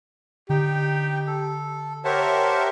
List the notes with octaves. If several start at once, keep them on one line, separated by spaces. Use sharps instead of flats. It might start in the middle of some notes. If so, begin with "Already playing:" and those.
D3 D#4 G4 G5
A4
G4 A#4 C5 C#5 E5 F#5 A5